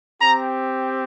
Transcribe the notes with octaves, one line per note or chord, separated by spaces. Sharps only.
C4 G4 A#5